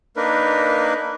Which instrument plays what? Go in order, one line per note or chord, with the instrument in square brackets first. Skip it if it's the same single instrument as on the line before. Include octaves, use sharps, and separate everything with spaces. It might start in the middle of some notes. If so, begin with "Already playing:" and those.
[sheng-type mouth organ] A#3 D4 D#4 A#4 B4